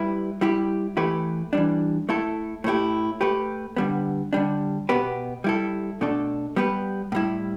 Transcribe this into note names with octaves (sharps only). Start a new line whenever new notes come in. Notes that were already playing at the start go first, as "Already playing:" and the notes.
Already playing: G3 E4 B4
G3 E4 G4
E3 A3 E4 G4 B4
E3 G3 D4
A3 E4 A4
A2 A3 E4 G4
A3 G4 B4
D3 G3 B3
D3 G3 D4
B2 B3 G4 B4
G3 E4 A4
B2 A3 D4 A4
G3 B3 G4 B4
A2 G3 E4